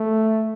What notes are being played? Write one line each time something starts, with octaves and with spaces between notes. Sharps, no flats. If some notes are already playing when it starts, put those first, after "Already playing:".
Already playing: A3